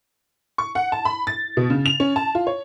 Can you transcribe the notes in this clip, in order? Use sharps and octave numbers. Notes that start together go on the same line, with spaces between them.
C#6
F#5
A5
B5
A6
B2
C#3
F7
C#4
A5
F4
C#5